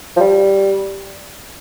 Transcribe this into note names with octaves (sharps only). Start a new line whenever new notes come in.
F3
G3